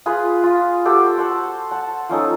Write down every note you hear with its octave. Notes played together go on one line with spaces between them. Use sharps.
F4 G#4 B4
F4
F#4 G4 A4 C5
C5 F#5 A5
F#5 A5
F3 C#4 D#4 A4